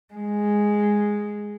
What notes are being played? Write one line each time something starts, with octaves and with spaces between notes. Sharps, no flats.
G#3